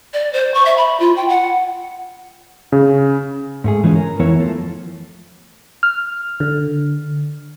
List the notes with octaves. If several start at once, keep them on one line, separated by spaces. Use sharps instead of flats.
D5
C5
C#6
E5
B5
F4
G5
F#5
C#3
G#2 A3 G#4
E3 F3 G#3 C#4
A#4
F2 E3 B3 E4 A#4 C#5
F3 A3
F6
D3